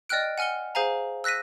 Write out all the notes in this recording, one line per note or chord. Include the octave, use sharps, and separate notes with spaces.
D5 D#5 G5 F6 F#6 D7
F#5 G#5 F6 C#7 G7
G#4 C5 F5 G#5 A#5
E6 F#6 A#6 B6 D#7